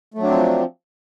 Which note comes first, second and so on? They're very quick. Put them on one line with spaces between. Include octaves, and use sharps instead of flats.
A3 F#3 D4 C4 F3